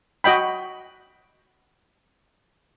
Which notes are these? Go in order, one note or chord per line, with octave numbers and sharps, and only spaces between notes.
F#4 D#5 G5 B5